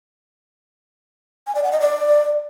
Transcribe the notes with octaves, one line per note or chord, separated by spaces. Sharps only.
G#5
D5
F#5
D#5
D5